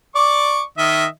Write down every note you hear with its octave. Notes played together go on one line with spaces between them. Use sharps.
D5 C#6 D6
D#3 D#5 E5